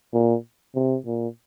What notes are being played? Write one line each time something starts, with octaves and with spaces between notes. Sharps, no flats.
A#2
C3
A#2